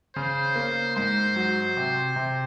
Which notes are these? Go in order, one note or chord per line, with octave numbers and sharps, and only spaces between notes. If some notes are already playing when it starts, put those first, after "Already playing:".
C#3 C5
A#3
G#2 C5
F#3
C3
C3